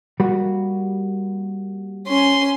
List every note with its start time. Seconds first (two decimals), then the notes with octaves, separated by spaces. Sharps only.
0.20 G3 A#3 F#4
2.07 C#4 C6